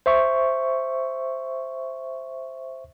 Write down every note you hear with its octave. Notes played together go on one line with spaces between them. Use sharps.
C5 E5 C#6